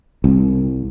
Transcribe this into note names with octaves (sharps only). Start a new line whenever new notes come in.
C2